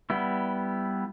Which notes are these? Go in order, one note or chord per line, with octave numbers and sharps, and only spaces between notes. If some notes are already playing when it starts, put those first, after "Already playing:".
G3 B3 E4